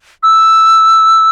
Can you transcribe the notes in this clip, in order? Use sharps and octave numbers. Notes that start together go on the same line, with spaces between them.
E6